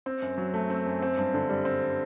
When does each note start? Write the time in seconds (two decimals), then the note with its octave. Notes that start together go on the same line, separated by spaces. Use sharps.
0.06 C4
0.22 F#2
0.38 F#3
0.54 A3
0.70 C4
0.86 F#2
1.02 C4
1.17 G2
1.34 D3
1.50 G3
1.65 C4